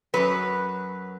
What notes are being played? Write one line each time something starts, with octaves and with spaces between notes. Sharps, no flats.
F#2 C#3 F#3 B4